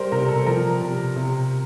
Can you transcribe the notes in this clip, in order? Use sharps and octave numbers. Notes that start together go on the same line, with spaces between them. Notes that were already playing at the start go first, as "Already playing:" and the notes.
Already playing: G3 A#4 C5
C3 A#4
A4
F3 A#4
C3
C3